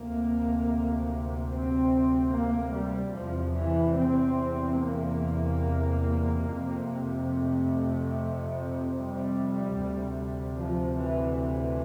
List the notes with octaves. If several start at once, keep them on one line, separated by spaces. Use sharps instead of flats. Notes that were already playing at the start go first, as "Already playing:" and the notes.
Already playing: D2 C3 A#3
C4
A#3
G3
E2 C3 F3
E3
C4
A#3
F2 C3
A3
G3
D2 C3
F3
E3
E3